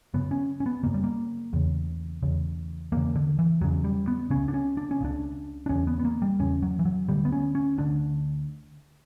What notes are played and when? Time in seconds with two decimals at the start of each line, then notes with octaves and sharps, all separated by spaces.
0.14 F#2 C#3 B3
0.31 C#4
0.60 C#4
0.66 B3
0.83 F#2 C#3 A#3
0.94 G3
1.04 A#3
1.53 E2 C#3
2.23 E2 C#3
2.92 E2 C#3 A#3
3.16 D3
3.39 E3
3.61 E2 C#3 F#3
3.84 G3
4.08 B3
4.30 C#2 C#3 C#4
4.48 D4
4.54 C#4
4.77 D4
4.91 C#4
5.01 C#2 C#3 D4
5.66 D4
5.69 E2 C#3 C#4
5.87 B3
5.99 B3
6.05 A#3
6.22 G3
6.39 E2 C#3 C#4
6.62 F#3
6.79 E3
6.85 F#3
7.09 D2 D3 G3
7.25 B3
7.32 C#4
7.55 C#4
7.78 D2 D3 D4